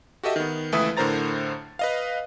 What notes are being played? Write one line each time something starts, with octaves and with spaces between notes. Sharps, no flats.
F#4 G4 A4 D#5 E5
D#3 B3
C#2 E3 A3 B4 E5 D#6
A2 D3 A#4 C5 A#5 A6
B4 D#5 F5